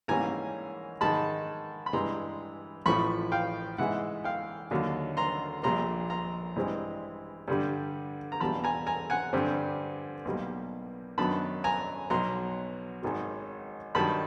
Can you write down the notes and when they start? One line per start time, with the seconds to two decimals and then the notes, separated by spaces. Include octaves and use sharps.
0.08 G#2 E3 G3 A#3 C#4 G#5 A#5
1.01 G#2 D#3 G#3 A5 B5
1.86 B5
1.93 G2 E3 G#3 A#5 C6
2.86 A1 A2 F3 B5 C#6
3.32 F5 G5
3.78 G#2 E3 G#3 E5 F#5
4.24 F5 G5
4.71 D#2 D3 F#3 A#3 D4
5.17 A#5 C6
5.63 A#1 A#2 G3 A#3 A#5 C6
6.10 A#5 C6
6.56 G2 E3 G#3 C4
7.48 G2 D3 G3
8.32 A#5
8.40 E2 B2 G3 A#3 A5 B5
8.64 G#5 A#5
8.87 G#5 A#5
9.10 F#5 G#5
9.33 G2 D3 G3 C4
10.25 B1 B2 G3 A#3
11.18 F#2 D#3 F#3 B3 D4 A5 B5
11.64 G#5 A#5
12.10 B1 B2 F#3 A#5 C6
13.02 G#1 G#2 D#3 F#3
13.95 G2 D#3 F#3 A5 B5